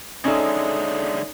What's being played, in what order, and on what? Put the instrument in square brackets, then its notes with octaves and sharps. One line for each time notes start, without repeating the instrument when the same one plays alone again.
[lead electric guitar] D3 G#3 [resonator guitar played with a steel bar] C#4 D#4 A4 [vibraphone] C#5 D5 E5